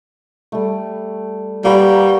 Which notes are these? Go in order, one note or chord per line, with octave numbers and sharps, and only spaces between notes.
G3 A3
G3 A#3 F#4 B4